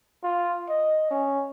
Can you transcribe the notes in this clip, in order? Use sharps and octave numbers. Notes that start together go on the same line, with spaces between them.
F4
D#5
C#4